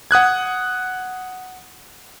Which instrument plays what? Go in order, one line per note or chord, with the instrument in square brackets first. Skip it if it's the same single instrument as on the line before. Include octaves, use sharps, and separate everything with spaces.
[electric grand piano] F#5 D#6 F#6 G#6